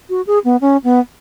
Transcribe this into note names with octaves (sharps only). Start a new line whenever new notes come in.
F#4
G#4
B3
C#4
B3